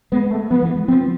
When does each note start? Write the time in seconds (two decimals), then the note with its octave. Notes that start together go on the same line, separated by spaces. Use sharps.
0.12 G#3 B3
0.31 A3
0.50 F3 B3
0.62 E3
0.76 G#3
0.88 F3 C4